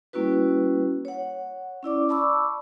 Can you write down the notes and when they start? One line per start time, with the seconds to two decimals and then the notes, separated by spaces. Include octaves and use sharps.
0.13 G3 A#3 C#4 E4 F#4 B4
1.05 C#5 F#5
1.83 C#4 E4 D5 D6
2.09 D5 A5 B5 C#6 D6 E6